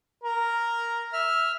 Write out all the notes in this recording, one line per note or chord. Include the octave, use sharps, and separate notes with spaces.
A#4
E5 F6